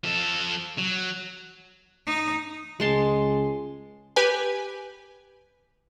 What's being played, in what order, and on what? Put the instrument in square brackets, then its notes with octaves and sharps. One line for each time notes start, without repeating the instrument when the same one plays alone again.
[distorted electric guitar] F3 A4
F#3
[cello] D#4
[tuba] C#2 [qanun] G#3 A5 C6
[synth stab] G4 B4 G#5